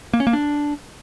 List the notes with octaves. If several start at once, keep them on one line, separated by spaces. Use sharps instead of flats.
A#3
C#4
A#3
D4